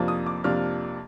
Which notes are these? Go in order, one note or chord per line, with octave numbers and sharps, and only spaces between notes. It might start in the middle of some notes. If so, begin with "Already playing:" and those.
Already playing: F2 C3 F3 A#3 D4
D#6
D6
F2 C3 F3 A#3 D4 F6